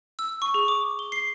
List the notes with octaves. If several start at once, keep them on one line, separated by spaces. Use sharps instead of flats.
E6
C#6
G#4
D6
G7
C7